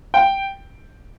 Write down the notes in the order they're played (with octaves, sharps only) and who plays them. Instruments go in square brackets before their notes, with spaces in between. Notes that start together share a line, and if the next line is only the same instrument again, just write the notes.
[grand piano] G5